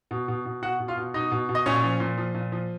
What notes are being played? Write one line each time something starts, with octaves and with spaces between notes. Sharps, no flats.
B2
B2
B2
B2 F#4 F#5
B2
F4 F5
B2
B2 D#4 D#5
B2
B2
D#5
A#2 C#4 C#5
F3
A#2
F3
A#2
F3